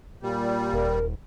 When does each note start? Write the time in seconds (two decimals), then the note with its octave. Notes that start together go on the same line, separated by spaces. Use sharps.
0.23 A#2 G3
0.73 D#1 A#4